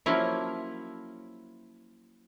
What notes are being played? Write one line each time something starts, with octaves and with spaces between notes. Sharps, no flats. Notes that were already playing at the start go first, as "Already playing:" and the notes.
F3 F#3 A#3 C#4 E4